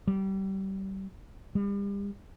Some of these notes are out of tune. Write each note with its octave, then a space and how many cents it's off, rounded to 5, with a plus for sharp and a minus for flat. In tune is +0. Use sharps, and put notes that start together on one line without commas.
G3 -25
G3 +35